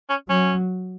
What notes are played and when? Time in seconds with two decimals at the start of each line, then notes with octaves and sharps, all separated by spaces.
0.09 C#4
0.29 F#3 C#4